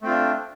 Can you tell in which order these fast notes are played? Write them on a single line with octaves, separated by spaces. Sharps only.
A3 C4 F4 D4